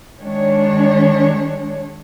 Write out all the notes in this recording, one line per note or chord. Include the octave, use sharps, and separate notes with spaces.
D#3 G#3 D4 C#5